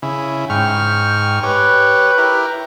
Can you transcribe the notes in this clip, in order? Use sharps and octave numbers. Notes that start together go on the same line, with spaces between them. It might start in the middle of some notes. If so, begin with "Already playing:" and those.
C#3 E4
G#2 G5 C#6 F6
G4 B4 C#5
E4 G4 A#4